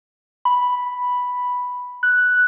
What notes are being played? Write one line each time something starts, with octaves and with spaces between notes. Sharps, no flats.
B5
F#6